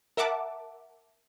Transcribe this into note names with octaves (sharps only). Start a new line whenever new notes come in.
A#4 E5 F#5 A5 D6